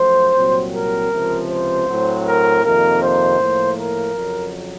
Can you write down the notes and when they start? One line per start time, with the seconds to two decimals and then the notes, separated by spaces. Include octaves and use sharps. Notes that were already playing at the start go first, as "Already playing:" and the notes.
Already playing: F#2 F3 A3 C5
0.35 C2 A#2 F#3 C4
0.73 A#4
1.12 C#2 C3 F3
1.50 C5
1.87 A2 F#3 C4
2.25 A#4
2.63 F2 C3 D#3 A#3 A#4
3.01 C5
3.39 A2 F3 A#3
3.77 A#4
4.16 F2 C#3 F#3